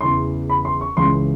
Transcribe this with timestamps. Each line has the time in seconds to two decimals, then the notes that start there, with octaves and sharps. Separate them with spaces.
0.01 E2 C#3 E3 C6
0.50 B5
0.65 C6
0.81 C#6
0.97 C#2 C#3 E3 C6